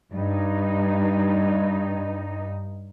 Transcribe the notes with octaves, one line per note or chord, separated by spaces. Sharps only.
G2 D#4